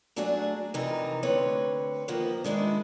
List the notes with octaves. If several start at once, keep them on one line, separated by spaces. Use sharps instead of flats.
F#3 A3 D4 F#4 G#4 D5
F2 C3 E3 D#4 A#4
D2 D3 C4 B4 C#5
D#3 F3 A#3 B3
D#3 G#3 D4 E4